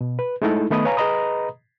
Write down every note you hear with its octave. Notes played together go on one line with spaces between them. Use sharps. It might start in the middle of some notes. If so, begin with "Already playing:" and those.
B2
B4
G#3 A3 D#4 E4 A4
D#3 A3 B3 D#5 B5 D#6
B4 C#5 F5 G#5 A#5
G#4 B4 D#5 A#5 B5 D#6